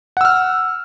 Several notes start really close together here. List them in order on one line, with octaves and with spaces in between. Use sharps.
F#5 E6 F6